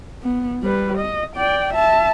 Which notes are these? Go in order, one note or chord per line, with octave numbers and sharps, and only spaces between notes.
B3
G3 B4
D#5
D5 G5
E5 A5